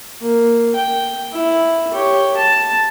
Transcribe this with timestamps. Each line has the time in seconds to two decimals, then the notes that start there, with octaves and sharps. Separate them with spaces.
0.21 A#3
0.75 G5
1.33 E4
1.94 G4 C#5
2.37 A5